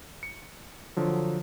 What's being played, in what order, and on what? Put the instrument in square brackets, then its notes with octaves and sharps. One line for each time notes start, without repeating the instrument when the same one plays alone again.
[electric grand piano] C#7
D3 F3 F#3